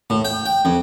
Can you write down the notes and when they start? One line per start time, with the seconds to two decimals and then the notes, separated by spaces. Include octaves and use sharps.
0.10 A2
0.25 G5
0.46 G5
0.65 F2